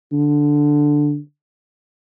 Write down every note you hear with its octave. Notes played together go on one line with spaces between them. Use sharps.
D3